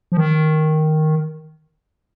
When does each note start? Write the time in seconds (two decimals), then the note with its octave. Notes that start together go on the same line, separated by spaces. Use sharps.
0.12 F3
0.17 D#3